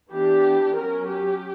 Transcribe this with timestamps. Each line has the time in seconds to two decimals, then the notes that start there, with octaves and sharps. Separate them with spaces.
0.10 E3 B3 D4 G4
0.75 F#3 C#4 A#4
1.07 G4